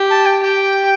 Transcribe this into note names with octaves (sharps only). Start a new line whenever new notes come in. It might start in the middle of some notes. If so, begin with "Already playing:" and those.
Already playing: G4
A5
G5
G4 G5